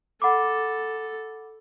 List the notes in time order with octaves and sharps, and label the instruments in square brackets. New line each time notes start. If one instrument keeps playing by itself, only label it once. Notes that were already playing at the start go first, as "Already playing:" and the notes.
[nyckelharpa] A4 [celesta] F#5 B5 D6